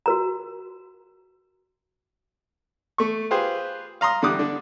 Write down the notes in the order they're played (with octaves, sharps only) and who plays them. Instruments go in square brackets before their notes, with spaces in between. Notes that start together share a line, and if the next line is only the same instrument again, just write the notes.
[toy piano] F#4 A#4 A#5
[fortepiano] A3 C#6
F4 G4 G#4 B4 C5
F5 A#5 C6 D#6
A1 D3 G3 D6 D#6 F#6
D3 D4